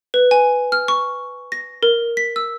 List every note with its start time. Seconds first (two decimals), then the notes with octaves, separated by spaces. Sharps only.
0.14 B4
0.31 G#5
0.72 F6
0.88 C#6
1.52 A#6
1.83 A#4
2.17 B6
2.36 E6